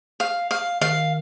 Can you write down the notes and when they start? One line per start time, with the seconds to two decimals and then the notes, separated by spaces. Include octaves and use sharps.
0.20 F5
0.51 F5
0.81 D#3 F5